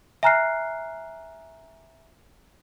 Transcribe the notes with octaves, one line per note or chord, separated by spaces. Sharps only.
E5 G#5 A#5 F6 F#6 C7